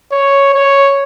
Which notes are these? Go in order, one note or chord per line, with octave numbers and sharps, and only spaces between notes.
C#5
C#5